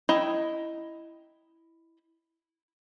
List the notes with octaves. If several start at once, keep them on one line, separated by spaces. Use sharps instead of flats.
E4 D#5 G5 A#5